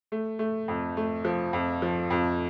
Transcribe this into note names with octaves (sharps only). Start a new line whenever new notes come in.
A3
A3
F2
A3
F3
F2
F3
F2